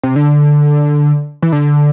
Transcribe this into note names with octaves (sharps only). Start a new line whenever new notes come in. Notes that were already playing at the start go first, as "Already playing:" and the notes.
C3
D3
E3
D3